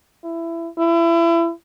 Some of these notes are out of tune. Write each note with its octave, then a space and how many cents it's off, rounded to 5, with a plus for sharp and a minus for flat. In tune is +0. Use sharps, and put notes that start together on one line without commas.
E4 +20
E4 +30